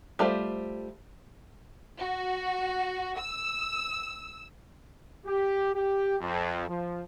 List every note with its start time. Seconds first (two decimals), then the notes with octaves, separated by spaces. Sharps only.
0.19 G3 A3 F4 C5
1.99 F#4
3.18 E6
5.25 G4
5.74 G4
6.20 F2
6.68 F3